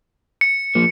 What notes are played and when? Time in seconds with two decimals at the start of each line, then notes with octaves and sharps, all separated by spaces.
0.41 C#7
0.75 F3 A#3